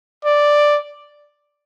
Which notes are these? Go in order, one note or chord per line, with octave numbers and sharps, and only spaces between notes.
D5